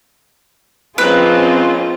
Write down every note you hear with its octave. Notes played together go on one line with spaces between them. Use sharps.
F3 G#3 A#3 C4 C#4 F4 B4